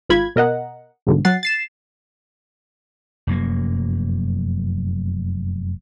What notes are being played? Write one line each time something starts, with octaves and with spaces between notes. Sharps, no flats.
G#1 G#2 F4 B5 G#6
B2 A#4 D#5 F#5
C2 G#2 B2 D3
F#3 F#5 A6 C7
A6 C7 E7
F1 F#2 F#3 A#3